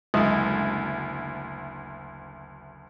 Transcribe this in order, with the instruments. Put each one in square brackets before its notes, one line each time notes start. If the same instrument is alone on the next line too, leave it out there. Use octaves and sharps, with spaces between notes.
[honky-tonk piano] F#1 D2 [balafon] G#3